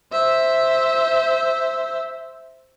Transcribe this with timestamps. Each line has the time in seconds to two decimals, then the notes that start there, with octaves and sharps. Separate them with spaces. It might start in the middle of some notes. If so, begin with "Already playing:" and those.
0.12 C5 E5